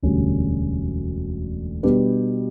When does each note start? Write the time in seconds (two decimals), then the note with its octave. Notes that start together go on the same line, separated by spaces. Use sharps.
0.03 E1 D2 D3 G3 C#4
1.83 B2 G3 D4 G4 B4